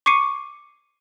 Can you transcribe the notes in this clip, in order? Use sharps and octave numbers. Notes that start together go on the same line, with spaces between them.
C#6 D6 C7 C#7 D#7